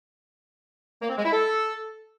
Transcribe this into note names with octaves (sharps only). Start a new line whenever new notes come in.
A#3
C4
G#3
E4
A4